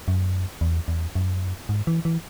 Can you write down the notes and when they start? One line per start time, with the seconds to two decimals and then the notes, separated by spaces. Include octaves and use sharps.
0.08 F#2
0.61 E2
0.88 E2
1.15 F#2
1.69 G#2
1.87 E3
2.05 E3